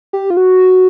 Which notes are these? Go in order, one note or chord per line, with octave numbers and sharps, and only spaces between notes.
G4
F4
F#4